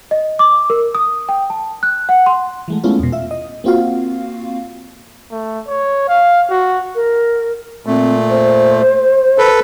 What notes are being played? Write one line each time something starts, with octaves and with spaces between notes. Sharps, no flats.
D#5
D6
A#4
D#6
G5
A5
F#6
F#5
C6
E3 G#3 A3
G#3 A3 B3 C#4 E4 F4
E2 B2
F4 E5
D#5
A#3 C4 F4 F#4 F5
A3
C#5
F5
F#4
A#4
A#2 A3 C4
C5
A4 B4